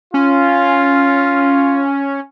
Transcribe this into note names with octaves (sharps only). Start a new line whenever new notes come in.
C#4 F4